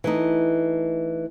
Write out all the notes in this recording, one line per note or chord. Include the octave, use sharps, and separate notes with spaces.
E3 A3 D#4